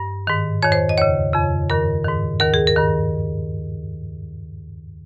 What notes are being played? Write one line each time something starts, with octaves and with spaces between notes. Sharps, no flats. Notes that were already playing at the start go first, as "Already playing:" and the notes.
Already playing: G2
G#2 D#3
F2 D#3 C#5
C5
D#5
D#2 C#3 C#5
F2 C#3
G2 D#3 A#4
G#2 D#3
D#2 D#3 A#4
G#4
A#4
G2 D#3